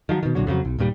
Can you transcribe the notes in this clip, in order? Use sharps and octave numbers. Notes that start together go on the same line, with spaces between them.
D#3 F3 F#3
B2 D#3
C2 A#2 D3 F#3
F2 C#3 E3 F#3
B1
D#1 G2 A#2 G3